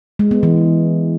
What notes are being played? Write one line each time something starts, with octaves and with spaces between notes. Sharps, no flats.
G#3
B3
E3